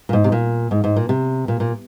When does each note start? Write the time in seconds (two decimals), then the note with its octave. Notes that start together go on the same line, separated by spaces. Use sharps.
0.09 A#2
0.13 G#2
0.24 C3
0.32 A#2
0.71 G#2
0.84 G#2
0.96 A#2
1.09 C3
1.48 A#2
1.60 A#2